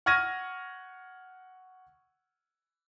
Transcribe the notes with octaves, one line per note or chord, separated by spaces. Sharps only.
F#5 C#6 F6 G#6 A#6 D#7